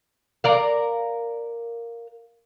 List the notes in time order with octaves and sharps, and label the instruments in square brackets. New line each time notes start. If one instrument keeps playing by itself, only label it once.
[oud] A#4 D5 F5